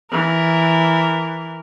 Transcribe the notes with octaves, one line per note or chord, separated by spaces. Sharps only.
E3 A#4